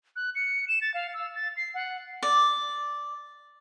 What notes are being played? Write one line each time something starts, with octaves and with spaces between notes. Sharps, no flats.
F#6
C#7
E7
A6
F5
E6
A6
C7
F#5
D5